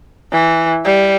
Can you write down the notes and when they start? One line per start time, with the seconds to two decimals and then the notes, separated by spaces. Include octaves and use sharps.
0.32 E3
0.84 G3